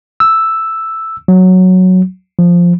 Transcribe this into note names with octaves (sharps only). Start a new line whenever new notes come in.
E6
F#3
F3